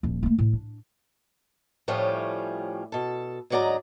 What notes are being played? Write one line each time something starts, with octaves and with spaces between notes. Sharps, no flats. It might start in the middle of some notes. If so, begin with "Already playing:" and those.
D#1 F3
A3 A#3
A2
D4
A2 F3 G3 A3 C#4
B2 A4
D2 G#2 F#3 D5 D#5 A#5